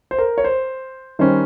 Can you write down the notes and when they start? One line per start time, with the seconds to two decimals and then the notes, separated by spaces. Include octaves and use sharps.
0.11 C5
0.18 A#4
0.38 C#5
0.44 C5
1.19 D#3 G3 C#4 C5